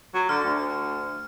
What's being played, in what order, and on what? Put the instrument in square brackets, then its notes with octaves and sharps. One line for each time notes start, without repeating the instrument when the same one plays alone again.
[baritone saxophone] F#3
[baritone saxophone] D3 [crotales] F6
[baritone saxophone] D2